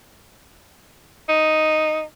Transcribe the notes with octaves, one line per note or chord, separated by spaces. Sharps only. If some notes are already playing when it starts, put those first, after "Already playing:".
D#4